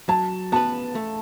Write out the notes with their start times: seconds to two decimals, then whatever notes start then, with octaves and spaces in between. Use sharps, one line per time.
0.09 F#3 A5
0.52 B3 F#4 B4 A5
0.95 A3